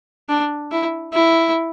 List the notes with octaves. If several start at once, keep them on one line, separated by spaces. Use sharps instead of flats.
D4
E4
E4